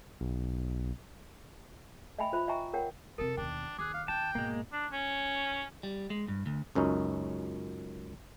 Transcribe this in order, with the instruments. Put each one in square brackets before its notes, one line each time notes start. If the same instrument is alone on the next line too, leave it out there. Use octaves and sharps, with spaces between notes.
[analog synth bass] B1
[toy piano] D#5 E5 G5 G#5 B5
F4 C5 E5 B5
D#5 E5 G5 G#5 A#5 C#6
A#4 C#5 F#5 G5
[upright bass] F2 C3 [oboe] A4 [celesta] A#4
[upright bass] D#2 B2 [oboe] D4 [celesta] G5
[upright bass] D#2 [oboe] G#4 [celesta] D6 F#6
[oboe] F5
[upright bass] D#3 [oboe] G5 [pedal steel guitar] A5
[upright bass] G#2 B2 [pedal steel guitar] G#3 A#3
[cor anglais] D4
C#4
[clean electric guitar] G3
G#3
G2
D2
[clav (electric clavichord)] C#2 F#2 C#4 D#4